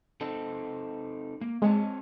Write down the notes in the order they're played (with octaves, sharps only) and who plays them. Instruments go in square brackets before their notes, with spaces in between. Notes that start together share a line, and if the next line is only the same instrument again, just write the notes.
[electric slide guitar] C4 D#4 A4
A#3
[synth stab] G#3 [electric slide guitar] C4 C#5 A5